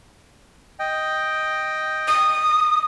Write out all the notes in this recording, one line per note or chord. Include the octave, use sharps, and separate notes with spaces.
D#5 G5
D#6